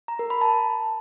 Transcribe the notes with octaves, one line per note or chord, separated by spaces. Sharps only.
A#5
A#4
B5
A5